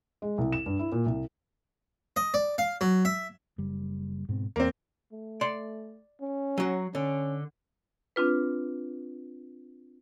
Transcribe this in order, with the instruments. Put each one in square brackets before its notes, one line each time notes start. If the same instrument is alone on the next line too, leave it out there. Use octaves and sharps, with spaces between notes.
[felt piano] G#3
C2
E7
G2
E4
A#2
C2
[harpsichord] D#5
D5
F5
F#3
E5
[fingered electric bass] F#1 G3
G#2 B2 C4
[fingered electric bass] E2 [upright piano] A#3 C4
[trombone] A3
[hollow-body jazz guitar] D5 C6
[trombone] C#4
[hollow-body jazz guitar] F#3 F#4
[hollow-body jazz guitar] D3 [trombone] C#4
[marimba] C4 D4 F4 B4